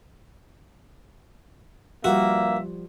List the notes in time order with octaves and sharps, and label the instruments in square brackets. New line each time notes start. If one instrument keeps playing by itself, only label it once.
[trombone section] G2 A#3 [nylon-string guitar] F3 G3 [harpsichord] F#4 [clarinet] E5